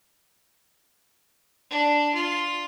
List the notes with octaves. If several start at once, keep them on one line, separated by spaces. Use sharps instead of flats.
D4
F4